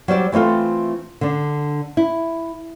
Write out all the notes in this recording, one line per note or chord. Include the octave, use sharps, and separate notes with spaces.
F#3 G3 C5 D5
E3 A3 C4 F4 A4
D3 D4
E4